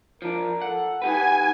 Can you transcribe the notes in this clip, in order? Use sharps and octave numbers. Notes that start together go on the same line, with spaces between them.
F3 D4 A#4
A4 F#5
D#4 G4 B4 F#5 G#5